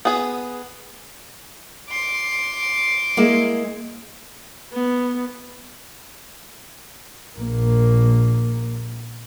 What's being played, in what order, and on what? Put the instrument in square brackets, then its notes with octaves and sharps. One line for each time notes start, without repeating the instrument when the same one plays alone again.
[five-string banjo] B3 G#4
[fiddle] C6 D6
[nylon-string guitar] G#3 A#3 E4
[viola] B3
[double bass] A#1 A#3